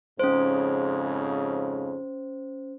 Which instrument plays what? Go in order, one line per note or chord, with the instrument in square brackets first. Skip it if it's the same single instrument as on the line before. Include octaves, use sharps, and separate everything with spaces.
[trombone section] F2 G#2 C#3 [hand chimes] C#4 C5